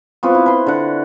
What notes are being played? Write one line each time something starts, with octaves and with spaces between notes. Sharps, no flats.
B3 C4 F4 F#4
E4
B4 C6
D3 F#5